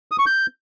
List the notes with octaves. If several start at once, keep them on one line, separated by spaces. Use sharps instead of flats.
D#6
C#6
G6